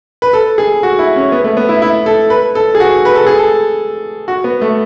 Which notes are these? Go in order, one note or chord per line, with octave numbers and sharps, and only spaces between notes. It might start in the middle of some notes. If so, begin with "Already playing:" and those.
B4
A4
G#4
F#4
E4
C#4
B3
A3
B3
E4
E4
A4
B4
A4
G#4
F#4
B4
A4
G#4
A4
F#4
B3
A3